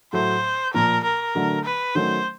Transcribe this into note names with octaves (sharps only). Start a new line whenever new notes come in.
A2 F#3 A3 C5
A#2 F3 A#3 A#4
A#4
D3 F#3 A3
B4
D#3 F#3 A3 C#4 C5